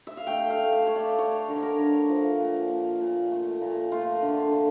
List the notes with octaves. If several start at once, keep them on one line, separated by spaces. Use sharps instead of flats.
E5
F5
A3 G5
F5
A3
F5
E5
A3 C#5
D5
A3 C#5
D3 A#4
C#5
A#4
D3
F3
A#2
A#2
A#2
A3
A#2
A3 F4
D3
D3